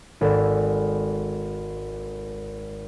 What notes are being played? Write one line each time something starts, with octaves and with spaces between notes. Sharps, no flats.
G#1 A4 D5